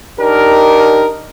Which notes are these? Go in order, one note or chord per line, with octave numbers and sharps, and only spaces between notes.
D4 D#4 G4 A#4